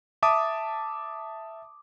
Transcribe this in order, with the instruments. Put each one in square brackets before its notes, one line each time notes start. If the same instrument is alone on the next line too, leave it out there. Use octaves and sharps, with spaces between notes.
[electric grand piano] E5 A5 D6 D#6